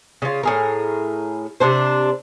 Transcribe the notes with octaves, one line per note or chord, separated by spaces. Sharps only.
C#3 F4
A2 G#4 A#4
C3 A#3 D4 C5